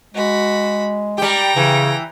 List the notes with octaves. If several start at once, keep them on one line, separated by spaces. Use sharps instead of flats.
G#3 F#4 B5
G3 G4 G5 A#5
C#3 E3